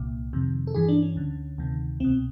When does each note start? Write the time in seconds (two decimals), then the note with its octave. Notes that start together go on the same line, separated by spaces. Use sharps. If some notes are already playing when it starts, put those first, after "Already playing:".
Already playing: C2 A#2
0.33 F2 C3 D#3
0.67 A4
0.74 G2 E3 G#4
0.88 D4
1.02 C#4
1.16 D2 D3
1.58 D2 C3 D#3
2.00 C2 B2 C4